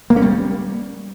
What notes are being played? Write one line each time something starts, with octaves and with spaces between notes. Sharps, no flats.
A#3
C#4
G3